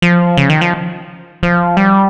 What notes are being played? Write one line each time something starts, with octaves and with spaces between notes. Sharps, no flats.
F3
C#3
D#3
F3
F3
G3